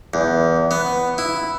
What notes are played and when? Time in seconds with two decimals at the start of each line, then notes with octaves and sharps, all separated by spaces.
0.14 E2
0.71 B3
1.18 E4